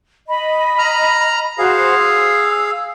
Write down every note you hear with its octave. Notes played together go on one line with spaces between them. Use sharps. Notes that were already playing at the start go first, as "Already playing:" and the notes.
D#5 B5
A#5 F6
F#4 G#4 C5 F5
E6